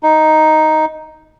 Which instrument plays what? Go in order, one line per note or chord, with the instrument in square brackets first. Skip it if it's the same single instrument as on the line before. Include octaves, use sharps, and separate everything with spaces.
[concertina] D#4